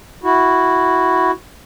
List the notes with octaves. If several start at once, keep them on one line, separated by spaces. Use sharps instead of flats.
E4 F#4